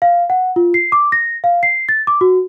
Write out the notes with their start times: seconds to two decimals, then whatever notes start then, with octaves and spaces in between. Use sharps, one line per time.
0.02 F5
0.30 F#5
0.56 F4
0.74 C7
0.92 D6
1.12 A#6
1.44 F5
1.63 C7
1.89 A6
2.07 D6
2.21 F#4